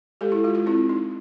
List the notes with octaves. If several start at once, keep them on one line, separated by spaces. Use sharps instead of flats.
G#3 G4 A4
E4
G#3 F4
F4
C4 E4
D#4